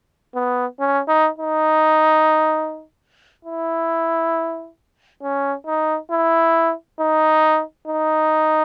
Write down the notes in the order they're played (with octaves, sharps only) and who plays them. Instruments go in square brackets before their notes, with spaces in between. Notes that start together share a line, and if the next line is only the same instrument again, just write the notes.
[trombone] B3
C#4
D#4
D#4
E4
C#4
D#4
E4
D#4
D#4